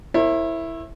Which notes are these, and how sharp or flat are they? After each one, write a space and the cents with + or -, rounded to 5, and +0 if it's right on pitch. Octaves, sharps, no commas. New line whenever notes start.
E4 +0 A#4 -20 C#5 -45